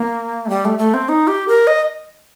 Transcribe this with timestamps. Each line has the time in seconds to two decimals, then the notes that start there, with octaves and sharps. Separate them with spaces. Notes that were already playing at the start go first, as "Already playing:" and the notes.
Already playing: A#3
0.45 A3
0.49 G3
0.65 A3
0.79 A3
0.94 C4
1.09 D#4
1.27 G4
1.48 A#4
1.67 D#5